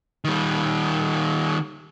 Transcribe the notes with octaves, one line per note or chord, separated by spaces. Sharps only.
D#3 G3